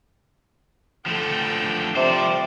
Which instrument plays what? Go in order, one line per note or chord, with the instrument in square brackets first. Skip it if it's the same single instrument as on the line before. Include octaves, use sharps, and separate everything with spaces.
[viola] D3 G5 [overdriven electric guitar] F3 A3
[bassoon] C3 [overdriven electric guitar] F3 C5 [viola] G3 D5